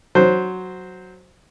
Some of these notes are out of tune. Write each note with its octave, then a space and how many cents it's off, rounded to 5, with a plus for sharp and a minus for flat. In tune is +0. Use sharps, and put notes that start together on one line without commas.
F#3 +0 C5 +0